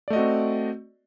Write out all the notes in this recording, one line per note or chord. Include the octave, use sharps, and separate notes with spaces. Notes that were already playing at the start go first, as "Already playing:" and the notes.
A3 C4 F#4 D5 D#5